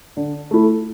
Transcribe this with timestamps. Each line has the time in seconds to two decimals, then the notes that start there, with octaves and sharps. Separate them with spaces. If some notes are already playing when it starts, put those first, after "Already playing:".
0.17 D3
0.51 A3 E4